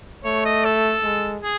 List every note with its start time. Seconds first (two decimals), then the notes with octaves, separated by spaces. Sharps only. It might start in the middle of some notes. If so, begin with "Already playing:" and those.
0.24 A3 C#5
0.45 D#5
0.65 A4
1.04 G#3
1.42 G#4